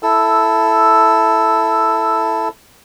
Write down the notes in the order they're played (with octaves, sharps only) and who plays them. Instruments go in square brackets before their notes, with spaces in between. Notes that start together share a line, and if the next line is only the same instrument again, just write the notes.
[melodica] E4 A4 E6